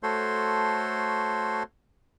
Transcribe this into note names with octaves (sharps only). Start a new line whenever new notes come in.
A3 F#4 A4 C5 C#5 C6